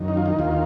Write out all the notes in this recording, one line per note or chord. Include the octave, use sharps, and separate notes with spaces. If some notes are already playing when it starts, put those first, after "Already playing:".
Already playing: F#2 D#3
D#4
F4
D#4
D#2 F4